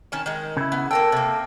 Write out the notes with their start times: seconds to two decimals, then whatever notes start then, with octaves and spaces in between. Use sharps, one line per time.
0.12 D#3 C#4 A5
0.26 D#3 G#3
0.57 C#3 E4
0.72 B3
0.91 A#3 A4 A#4 G5
1.12 C3 A#3